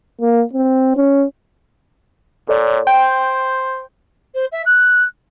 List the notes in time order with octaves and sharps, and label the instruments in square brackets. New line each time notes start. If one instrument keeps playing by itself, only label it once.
[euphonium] A#3
C4
C#4
[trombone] A#2 [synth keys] A4 C#5 D5
[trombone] C5 [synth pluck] G5 [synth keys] G6
[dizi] C5
E5
F#6